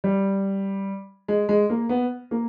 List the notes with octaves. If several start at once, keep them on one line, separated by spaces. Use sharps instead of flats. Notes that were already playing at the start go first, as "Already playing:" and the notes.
G3
G#3
G#3
A#3
B3
A#3